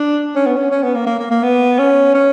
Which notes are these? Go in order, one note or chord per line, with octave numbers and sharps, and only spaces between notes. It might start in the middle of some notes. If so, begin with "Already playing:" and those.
Already playing: D4
C#4
B3
C#4
C#4
B3
A#3
A#3
A#3
A#3
B3
C#4
C#4